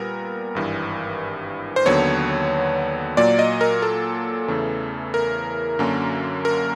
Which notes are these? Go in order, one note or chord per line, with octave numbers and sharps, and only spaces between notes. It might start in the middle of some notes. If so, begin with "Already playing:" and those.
Already playing: A#2 G3 B3 A#4
G#1 G2 E3
C5
D#2 D3 F#3 B3 C#5
A#2 F#3 A#3 D5
D#5
A#4
A4
E2 C#3 E3 A3
A#4
F#2 D3 F#3 A#3 C#4
A#4